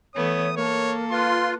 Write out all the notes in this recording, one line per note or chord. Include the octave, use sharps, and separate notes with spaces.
E3 A3 B3 C#5 D#6
A#3 A4 A#4 C#5
F4 B4 C6